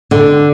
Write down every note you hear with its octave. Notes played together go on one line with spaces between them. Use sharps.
D3